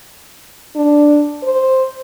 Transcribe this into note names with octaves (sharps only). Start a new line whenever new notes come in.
D4
C5